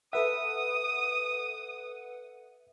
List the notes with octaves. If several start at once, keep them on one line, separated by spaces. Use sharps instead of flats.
A4 B4 E5 F#5 D#6